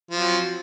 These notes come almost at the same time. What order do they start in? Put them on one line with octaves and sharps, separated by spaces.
F3 F#3 C4